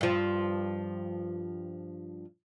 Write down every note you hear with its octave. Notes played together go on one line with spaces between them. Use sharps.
G2 F3